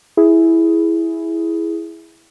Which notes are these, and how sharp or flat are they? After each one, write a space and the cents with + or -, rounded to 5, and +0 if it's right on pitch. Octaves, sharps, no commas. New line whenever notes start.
E4 +0 G#4 +0